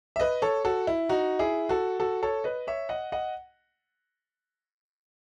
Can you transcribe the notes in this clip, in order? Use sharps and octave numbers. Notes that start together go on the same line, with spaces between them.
E5
B4 D#5
A4 C#5
F#4 A4
E4
D#4 F#4
E4 G#4
F#4 A4
F#4 A4
A4 C#5
B4 D#5
C#5 E5
D#5 F#5
D#5 F#5